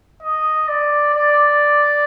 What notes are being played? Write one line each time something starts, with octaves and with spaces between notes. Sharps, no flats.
D#5
D5
D5